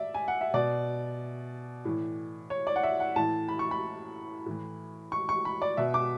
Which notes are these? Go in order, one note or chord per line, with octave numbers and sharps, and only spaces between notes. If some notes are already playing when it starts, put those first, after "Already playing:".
Already playing: D5 E5
G#5
F#5
E5
B2 D5
A2 E3
C#5
D5
F#5
E5
F#5
A2 E3 A5
B5
C#6
B5
A2 E3
C#6
C#6
B5
D5
B2 E5
D6